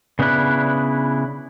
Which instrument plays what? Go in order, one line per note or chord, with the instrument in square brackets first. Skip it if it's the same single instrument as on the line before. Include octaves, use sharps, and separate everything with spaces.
[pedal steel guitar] C#3 B3 D4 E4 F#6